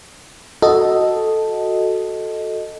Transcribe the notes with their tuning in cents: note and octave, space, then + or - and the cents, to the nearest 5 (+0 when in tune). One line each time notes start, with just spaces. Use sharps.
F#4 +0 A4 +0 D#5 +0